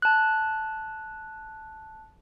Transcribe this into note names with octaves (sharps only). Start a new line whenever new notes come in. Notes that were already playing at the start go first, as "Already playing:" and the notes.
A5 F#6